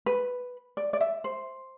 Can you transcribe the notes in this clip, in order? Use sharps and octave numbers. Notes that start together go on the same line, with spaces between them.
B4
D5
D5
E5
C5